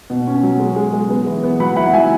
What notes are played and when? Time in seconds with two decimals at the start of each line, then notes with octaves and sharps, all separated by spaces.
0.10 B2
0.27 C#4
0.43 F#3
0.60 G#3
0.76 G#3
0.94 G#3
1.10 B3
1.26 E3
1.43 B3
1.60 F#3 F#5 B5
1.76 E4 F#5 B5
1.93 F#3 E5 G#5